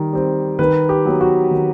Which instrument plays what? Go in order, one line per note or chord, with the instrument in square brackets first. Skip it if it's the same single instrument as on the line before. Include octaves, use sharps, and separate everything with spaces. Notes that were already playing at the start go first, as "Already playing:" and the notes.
Already playing: [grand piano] D#3 G3
G3 C4
D#3 B4
G4
F#3 B3
F#4
D#3